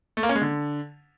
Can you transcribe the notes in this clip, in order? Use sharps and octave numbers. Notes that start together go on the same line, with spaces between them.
A3
A#3
C#4
G#3
D3